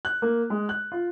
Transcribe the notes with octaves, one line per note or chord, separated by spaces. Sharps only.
F#6
A#3
G#3
F#6
F4